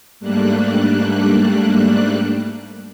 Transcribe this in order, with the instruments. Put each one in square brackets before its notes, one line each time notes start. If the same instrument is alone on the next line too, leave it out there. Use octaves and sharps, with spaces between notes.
[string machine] G#2 G3 A3 A#3 D4 F#6